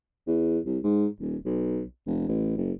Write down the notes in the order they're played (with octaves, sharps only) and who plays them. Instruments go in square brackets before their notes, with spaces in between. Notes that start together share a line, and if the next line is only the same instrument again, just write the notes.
[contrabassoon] E2
C2
G#2
D#1
B1
F1
A1
F#1